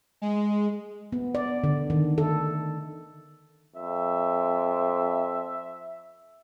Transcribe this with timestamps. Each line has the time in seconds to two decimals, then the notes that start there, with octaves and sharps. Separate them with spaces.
0.22 G#3
1.12 B3
1.35 D5
1.64 D3
1.90 D#3
2.18 A4
3.76 F2 E5